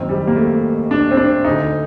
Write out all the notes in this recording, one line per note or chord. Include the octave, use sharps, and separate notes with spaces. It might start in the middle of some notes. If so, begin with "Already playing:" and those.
Already playing: F#1 F#2 D#3 C4
G3
A#3
A3
D4
C4
D4
D2 D3 D#4